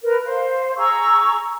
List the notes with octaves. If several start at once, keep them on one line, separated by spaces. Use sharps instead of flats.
A#4 B4
C5 F5
G#4 A#5 C#6 E6